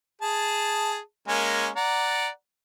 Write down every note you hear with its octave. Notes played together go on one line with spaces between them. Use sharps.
G#4 A5
G#3 A#3 C#4
D5 F#5 A#5